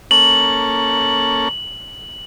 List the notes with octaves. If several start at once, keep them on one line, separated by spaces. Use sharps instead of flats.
A#3 C#4 A4 F#7